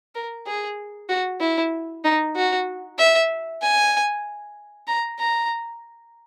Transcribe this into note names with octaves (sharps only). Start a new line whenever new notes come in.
A#4
G#4
F#4
E4
D#4
F#4
E5
G#5
A#5
A#5